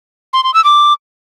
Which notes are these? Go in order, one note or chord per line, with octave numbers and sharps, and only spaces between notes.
C6
C6
E6
D6